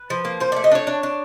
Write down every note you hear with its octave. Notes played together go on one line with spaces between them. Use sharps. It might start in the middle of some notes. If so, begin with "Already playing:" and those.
Already playing: B4
F3
A#3
F3 C5
A3 D5
D#5
D4 C#5
D4
D4